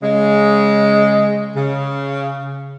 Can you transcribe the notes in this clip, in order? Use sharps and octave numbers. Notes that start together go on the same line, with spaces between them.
C#3 G#3
C#3